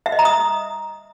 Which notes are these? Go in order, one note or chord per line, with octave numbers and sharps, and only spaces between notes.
E5
D#5
A#5
D#6